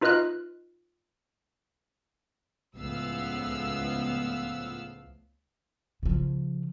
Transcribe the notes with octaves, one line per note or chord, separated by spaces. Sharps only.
D#4 F4 B4 D#5 F6 F#6
C#2 A2 F3 B3 F5 E6
C#3 F3